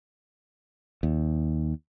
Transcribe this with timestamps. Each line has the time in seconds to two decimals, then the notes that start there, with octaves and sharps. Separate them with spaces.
1.03 D#2